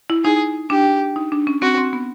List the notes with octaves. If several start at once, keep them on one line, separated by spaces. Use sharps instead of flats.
E4
D#4 G#4
D4 G4
D#4
D4
C#4
C4 F#4
C4
B3